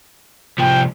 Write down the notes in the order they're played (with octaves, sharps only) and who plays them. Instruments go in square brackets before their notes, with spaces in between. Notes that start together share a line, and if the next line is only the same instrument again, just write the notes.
[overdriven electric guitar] C2 F3 [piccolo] G5